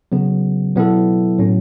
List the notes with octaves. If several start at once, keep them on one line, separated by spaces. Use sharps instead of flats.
C#3 F#3 B3
B2 F#3 B3 E4 A4
A2 F#3 C#4